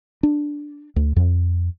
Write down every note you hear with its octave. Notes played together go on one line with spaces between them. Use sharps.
D4
D2
F2